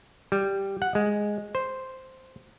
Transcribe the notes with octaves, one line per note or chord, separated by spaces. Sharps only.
G3
F#5
G#3
C5